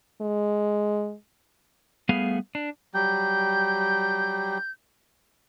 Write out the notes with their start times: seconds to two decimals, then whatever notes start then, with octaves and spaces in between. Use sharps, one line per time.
0.21 G#3
2.09 G3 A3 B3 G#4 F5
2.55 D4
2.94 F#3 G3 G5 G6